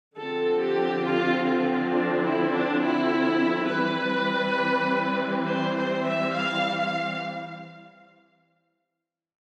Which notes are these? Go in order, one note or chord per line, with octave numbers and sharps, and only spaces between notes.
D3 F3 C4 A4
G4
F4
F4
D4
E4
D4
E4
E3 G3 C4 B4
C5
C5
E5
F5
F5